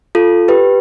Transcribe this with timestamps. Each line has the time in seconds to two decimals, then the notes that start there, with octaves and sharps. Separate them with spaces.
0.15 F4 A4
0.48 G4 B4